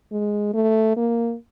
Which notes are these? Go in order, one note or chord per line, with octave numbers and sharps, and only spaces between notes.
G#3
A3
A#3